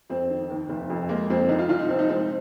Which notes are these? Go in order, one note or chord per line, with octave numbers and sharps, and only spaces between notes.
F2 C4
D#3
D#2
F1
F2
G#3 A#3
F2 C4
C2 D#4
F4
C2 F4
D#4
A#1 C4
D#4
G#3 C4
C4